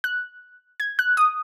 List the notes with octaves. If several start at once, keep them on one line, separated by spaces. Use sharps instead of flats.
F#6
G#6
F#6
D#6